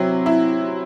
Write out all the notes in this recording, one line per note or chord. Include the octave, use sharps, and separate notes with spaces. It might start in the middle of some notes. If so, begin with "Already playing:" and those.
Already playing: C3 F#3 C4 E4
E4